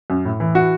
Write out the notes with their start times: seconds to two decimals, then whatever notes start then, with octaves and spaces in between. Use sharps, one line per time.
0.10 F#2
0.25 A2
0.40 E3
0.55 F#4